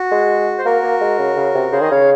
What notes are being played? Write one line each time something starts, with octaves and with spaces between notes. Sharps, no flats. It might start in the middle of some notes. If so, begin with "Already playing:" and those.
Already playing: F#4
G#3
C5
A#3 F#4 A#4
A#3
G#3
C#3
C#3
C3
C#3 G#4 C5
D#3 D#5
C#3 C#5 F5